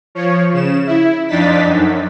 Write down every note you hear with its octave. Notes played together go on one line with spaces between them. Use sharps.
F3 C#5
C#3 E7
E4
F2 D4 D#4 A6 B6
F#2